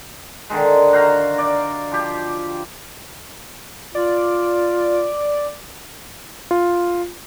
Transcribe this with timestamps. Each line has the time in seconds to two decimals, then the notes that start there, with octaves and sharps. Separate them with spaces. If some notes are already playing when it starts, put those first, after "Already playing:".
0.50 D3 D#3 G#3
0.93 F#4 C5 F5 A#5
1.38 D5
1.92 F3 G4
3.95 F4 D5
6.51 F4